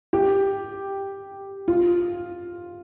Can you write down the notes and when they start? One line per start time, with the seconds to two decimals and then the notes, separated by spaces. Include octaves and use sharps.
0.13 G4
1.68 F4